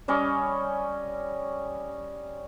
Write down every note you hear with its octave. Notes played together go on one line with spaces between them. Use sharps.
G3 C#4 D#5 D6